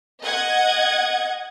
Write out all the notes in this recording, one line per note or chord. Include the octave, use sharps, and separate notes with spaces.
D#5 F#5 G#6